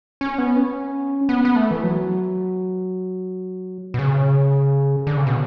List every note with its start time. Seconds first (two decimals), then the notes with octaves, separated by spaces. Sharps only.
0.21 C#4
0.38 B3
0.56 C#4
1.29 B3
1.45 B3
1.56 A3
1.71 E3
1.83 F#3
3.94 B2
3.99 C#3
5.07 D3
5.17 C#3
5.27 B2